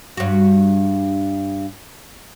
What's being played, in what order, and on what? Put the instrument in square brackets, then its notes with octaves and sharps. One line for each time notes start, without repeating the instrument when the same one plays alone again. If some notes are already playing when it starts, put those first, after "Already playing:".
[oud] G2 F#4